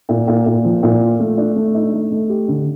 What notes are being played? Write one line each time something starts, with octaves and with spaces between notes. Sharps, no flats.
A#2
A#2
A#2
F3
A#2
F4
A3
D4
A3
D#4
A3
A3
G4
D3